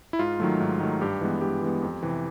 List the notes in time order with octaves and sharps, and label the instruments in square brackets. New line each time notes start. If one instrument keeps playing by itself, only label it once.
[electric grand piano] E4
G#2 F4
D#3 F#3 A3
G#2
D#3 F#3 A3
G2 G4
E3 G#3 B3
G2 G4
E3 G#3 B3
F2
C3 E3